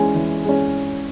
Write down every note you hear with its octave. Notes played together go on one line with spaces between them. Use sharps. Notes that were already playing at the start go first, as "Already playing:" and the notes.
Already playing: E3 G#3 C#4 G#5
E3
G#3 C#4